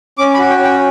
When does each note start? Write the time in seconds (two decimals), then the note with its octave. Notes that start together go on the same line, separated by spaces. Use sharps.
0.18 C#4 D6
0.34 B5
0.38 F#4
0.50 G5
0.59 C#4
0.64 G5